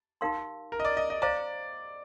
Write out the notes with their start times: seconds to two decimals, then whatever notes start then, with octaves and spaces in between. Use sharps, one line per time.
0.21 D#4 G4 A#4 F5 C6
0.72 A#4
0.80 D#5
0.85 D5
0.97 D#5
1.10 D#5
1.22 C5 D5 F5 A#5